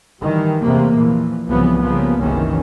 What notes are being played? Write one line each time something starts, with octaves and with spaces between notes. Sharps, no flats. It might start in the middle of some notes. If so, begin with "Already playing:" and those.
D#3 E3 G3
E2 C3 G3 A3 A#3
A#2 E3 F3
C2 G#2 C#3 E3 F3 B3
C#3 F3 G3 A#3 B3
F#1 C2 D#3 E3 C#4